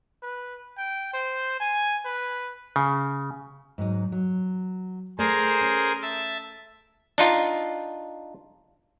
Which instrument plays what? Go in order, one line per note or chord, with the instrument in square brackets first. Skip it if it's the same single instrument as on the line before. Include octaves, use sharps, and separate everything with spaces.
[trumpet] B4
G5
C5
G#5
B4
[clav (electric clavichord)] C#3
[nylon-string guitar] G#2 F#3 D#4
F#3
[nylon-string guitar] A3 D5 [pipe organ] G#4 A#4 C5
[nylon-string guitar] C#4
[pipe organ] E5 A5
[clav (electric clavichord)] D4 D#4 F4